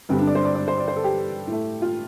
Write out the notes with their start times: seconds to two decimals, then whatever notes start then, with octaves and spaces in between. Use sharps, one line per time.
0.09 G2 D3 G3 C4
0.19 D4
0.27 D5
0.35 C5
0.45 D5
0.55 D5
0.68 C5
0.78 D5
0.88 C5
0.96 A4
1.04 G4
1.47 A2 A3
1.82 F4